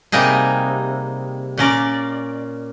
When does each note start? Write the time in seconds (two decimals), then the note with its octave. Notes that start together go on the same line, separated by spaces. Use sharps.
0.12 C3 G3 A#3 D#4 G#4
1.58 A#2 C#4 A#4 D5